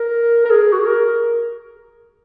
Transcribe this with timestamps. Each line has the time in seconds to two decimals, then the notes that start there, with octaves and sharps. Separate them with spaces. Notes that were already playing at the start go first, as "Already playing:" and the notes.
Already playing: A#4
0.45 A#4
0.50 G#4
0.72 F#4
0.79 G#4
0.86 A#4